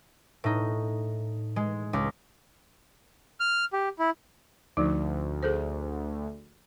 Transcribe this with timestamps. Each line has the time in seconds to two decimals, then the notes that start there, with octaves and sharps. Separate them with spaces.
0.44 A2 D#4
1.56 G#3
1.93 C#2
3.40 F6
3.73 G4
3.99 E4
4.77 D2 D3 F3 D#4
5.43 G#4 A4 C5